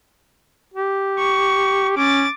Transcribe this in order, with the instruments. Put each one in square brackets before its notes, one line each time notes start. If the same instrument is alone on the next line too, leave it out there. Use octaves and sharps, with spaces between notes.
[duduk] G4
[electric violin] C#6
[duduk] C#4 [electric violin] D6 A6